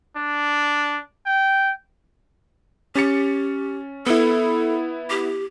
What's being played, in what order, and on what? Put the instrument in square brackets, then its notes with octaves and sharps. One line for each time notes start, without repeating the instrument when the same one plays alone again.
[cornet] D4
G5
[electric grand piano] C#4 A6 C#7 [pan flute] G4
[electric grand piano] B3 E4 [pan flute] A4
[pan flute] G4